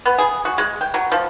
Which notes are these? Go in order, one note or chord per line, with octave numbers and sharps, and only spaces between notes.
B3
G#4
F#4
G#3
G5
F#3
F3